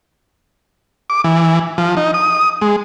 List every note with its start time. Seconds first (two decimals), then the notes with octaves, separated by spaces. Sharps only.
1.10 D6
1.24 E3
1.78 F3
1.97 D#4
2.14 D#6
2.61 G#3